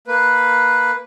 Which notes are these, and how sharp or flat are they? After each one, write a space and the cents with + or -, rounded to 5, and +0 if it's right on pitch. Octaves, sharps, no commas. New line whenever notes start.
A#3 +0 B4 +0